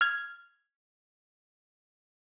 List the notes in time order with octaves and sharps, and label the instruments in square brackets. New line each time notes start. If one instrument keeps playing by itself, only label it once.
[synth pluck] F6 G#6